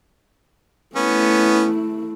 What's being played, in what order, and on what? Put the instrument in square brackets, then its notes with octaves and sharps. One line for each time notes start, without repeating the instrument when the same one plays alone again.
[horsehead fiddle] A3 E4 [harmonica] B3 C#4